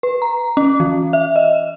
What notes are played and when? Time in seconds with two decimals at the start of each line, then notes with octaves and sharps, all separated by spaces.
0.03 B4
0.22 A#5
0.57 C#4
0.80 E3
1.13 E5
1.36 D#5